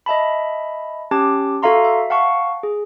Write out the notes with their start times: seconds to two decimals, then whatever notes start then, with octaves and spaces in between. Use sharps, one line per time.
0.06 D#5 E5 A5 B5
1.11 C#4 G4 A5 D6
1.62 F#4 A4 E5 F5 A#5 C6
1.84 E5
2.10 F5 F#5 A5 C#6
2.63 G#4